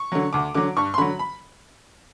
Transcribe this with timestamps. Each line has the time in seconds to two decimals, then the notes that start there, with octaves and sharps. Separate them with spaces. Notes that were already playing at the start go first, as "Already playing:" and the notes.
Already playing: C#6
0.12 D3 F#3
0.33 D2 D6
0.55 D3 F#3 D6
0.76 G2 C#6
0.94 C6
0.98 D3 F#3 B5
1.19 B5